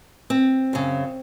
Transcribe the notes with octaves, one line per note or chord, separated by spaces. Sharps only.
C4
F#2 C#3